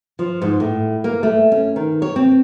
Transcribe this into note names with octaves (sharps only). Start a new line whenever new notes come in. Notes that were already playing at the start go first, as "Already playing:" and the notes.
F3
G#2
A2
A#3
A3
C#4
D#3
C#5
C4